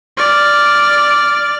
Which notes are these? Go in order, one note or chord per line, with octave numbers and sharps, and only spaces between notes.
D5 F6